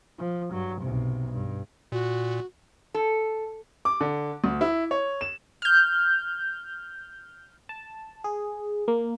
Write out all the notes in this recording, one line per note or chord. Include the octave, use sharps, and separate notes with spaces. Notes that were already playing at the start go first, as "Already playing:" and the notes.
F3
G2 F#3
B1 C3
G2
A#2 F#4
A4
D6
D3
D2
E4
C#5
E7
F6 G6
A5
G#4
A#3